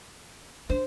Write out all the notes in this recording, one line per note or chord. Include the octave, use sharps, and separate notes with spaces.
D4 C5